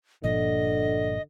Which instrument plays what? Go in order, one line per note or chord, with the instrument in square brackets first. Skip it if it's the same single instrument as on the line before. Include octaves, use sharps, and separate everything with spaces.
[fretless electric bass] G1 A#2 F3 [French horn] D3 [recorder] D#5